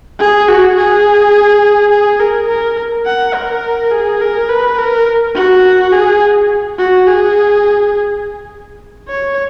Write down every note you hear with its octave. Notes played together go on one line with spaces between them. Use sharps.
G#4
F#4
G#4
G#4
A#4
A#4
F#5
A#4
G#4
A#4
B4
A#4
F#4
G#4
F#4
G#4
C#5